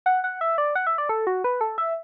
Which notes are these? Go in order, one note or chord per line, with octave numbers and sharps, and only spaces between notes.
F#5
F#5
E5
D5
F#5
E5
D5
A4
F#4
B4
A4
E5